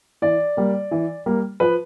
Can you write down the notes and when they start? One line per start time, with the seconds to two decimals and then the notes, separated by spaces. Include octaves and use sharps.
0.22 E3 D5
0.57 G3 A#3
0.91 E3
1.26 G3 A#3
1.60 F3 B4